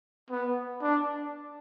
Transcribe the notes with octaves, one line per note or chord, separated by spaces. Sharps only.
B3
D4